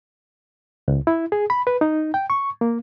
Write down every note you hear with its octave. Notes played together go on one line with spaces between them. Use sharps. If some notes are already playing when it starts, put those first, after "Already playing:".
C#2
E4
G#4
B5
B4
D#4
G5
C#6
A#3